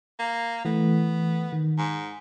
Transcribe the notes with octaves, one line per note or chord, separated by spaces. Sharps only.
A#3
E3 A3 B3
D#3
G#2